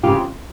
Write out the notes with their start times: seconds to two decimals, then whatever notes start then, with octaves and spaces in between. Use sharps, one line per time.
0.03 C#3 E3 G3 C4 F4 G4